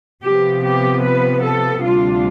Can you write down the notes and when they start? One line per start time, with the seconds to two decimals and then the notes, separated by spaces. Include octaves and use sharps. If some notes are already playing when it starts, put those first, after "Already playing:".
0.23 C3 F3 B3 G4
0.63 G4
1.03 B4
1.43 A4
1.82 D2 C3 G3 D4 F4